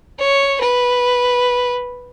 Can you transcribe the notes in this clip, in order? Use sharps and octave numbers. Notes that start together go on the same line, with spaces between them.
C#5
B4